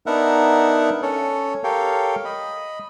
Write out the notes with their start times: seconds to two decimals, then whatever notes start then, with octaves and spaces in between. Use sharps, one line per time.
0.06 B3 D4 D#4 A#4 E5 F#5
1.02 C#4 A4 C#5
1.64 G4 A4 A#4 C#5 F5 G5
2.25 D#5 B5